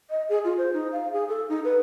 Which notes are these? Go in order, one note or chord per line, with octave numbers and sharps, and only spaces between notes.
D#5
G#4
F4
C5
D#4
F5
G#4
A4
D#4
B4